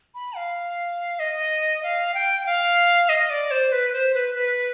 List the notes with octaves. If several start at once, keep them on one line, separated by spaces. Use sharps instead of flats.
B5
F5
D#5
F5
G5
F5
D#5
D5
C5
B4
C5
B4
B4